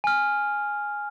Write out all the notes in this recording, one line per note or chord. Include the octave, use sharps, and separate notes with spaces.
G#5 F6